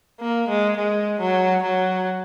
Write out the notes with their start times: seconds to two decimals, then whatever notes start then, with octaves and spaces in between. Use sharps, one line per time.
0.20 A#3
0.48 G#3
0.77 G#3
1.20 F#3
1.62 F#3